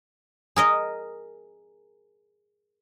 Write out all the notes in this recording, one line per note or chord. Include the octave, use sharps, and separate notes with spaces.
G#4 A#4 D#5